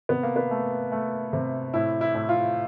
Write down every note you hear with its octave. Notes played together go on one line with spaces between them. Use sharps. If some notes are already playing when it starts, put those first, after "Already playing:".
C3 B3
A#3
B3
A3
A3
C3
A2 E4
E4
A2
F4